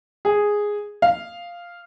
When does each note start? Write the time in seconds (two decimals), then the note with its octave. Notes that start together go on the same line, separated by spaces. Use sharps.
0.25 G#4
1.02 F5